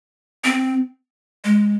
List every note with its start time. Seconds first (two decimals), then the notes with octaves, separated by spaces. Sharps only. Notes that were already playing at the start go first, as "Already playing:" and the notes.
0.44 C4
1.44 G#3